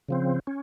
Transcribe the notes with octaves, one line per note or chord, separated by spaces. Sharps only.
C#3 F3 C4
C#4